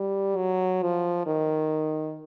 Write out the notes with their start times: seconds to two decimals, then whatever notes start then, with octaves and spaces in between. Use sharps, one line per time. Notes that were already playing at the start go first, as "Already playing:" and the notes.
Already playing: G3
0.37 F#3
0.82 F3
1.26 D#3